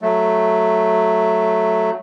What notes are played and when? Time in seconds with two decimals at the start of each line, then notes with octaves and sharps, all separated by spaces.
0.02 F#3 A3